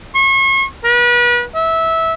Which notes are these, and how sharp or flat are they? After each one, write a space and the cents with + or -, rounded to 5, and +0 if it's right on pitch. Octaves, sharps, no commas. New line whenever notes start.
C#6 -40
B4 -35
E5 -15